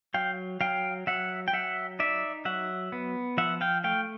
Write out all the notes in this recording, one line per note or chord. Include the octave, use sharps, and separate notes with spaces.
F#3 F5 G5
F#3 F5 G5
F#3 E5 F#5
G5
F#3 E5 F#5
D#4 D5 E5
F#3 E5 F#5
B3
F3 E5 F#5
F5 G5
A3 F5 G5